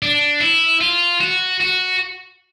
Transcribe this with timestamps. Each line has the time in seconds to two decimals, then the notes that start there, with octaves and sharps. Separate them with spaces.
0.02 D4
0.41 E4
0.81 F4
1.21 F#4
1.60 F#4